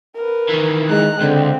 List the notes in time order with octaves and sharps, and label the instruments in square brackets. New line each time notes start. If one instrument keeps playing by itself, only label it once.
[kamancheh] A#4 B4
[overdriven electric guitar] D#3 E3
[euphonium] G#3 [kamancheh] A#5 F#6
[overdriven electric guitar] C#2 [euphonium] D3 [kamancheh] C4